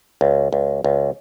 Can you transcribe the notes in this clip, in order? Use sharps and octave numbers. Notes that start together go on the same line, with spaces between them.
C#2
C#2
C#2